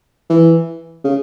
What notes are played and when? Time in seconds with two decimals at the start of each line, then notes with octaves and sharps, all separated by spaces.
0.30 E3
1.04 C#3